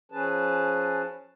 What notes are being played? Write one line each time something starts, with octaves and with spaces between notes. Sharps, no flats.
F3 C#4 G#4 B4 A5